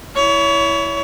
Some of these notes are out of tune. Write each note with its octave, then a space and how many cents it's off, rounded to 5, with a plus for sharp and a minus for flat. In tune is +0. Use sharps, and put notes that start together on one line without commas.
E4 +0 C#5 +30